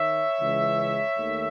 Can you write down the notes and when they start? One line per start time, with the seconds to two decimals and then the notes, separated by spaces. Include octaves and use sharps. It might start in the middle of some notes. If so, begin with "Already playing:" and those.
Already playing: D#3 C#5 E5
0.41 C#2 C#3 E3 G#3
1.17 D#2 D#3 A3